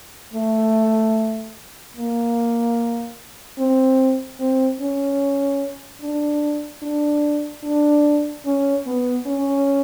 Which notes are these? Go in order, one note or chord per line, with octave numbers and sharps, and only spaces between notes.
A3
A#3
C4
C4
C#4
D4
D4
D4
C#4
B3
C#4